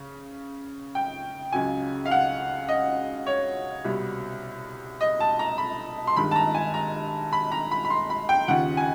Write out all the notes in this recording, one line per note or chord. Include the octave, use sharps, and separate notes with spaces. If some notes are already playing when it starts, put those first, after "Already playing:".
Already playing: C#3
G5
C#2 C#3 F#3 G#5
F5
F#5
D#5
C#5
C2 B2 G3
D#5
A5
A#5
B5
C6
G2 D#3 G#3 B5
A5
A#5
G#5
A#5
B5
A#5
B5
B5
C6
B5
G5
D#2 C#3 F3 F#5
G#5